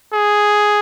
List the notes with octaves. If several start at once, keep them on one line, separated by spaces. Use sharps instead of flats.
G#4